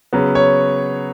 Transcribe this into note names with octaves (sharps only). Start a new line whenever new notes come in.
C#3 F#3 B3
C#5